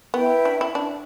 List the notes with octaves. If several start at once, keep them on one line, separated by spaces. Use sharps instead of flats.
B3 E4 B4 G5
D4
E4
D4